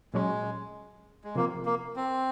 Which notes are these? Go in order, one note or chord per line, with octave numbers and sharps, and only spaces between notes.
A#2 F#3 G#3 C#4
G#3
C3 F3 A#3 C4 F4
A#3
C4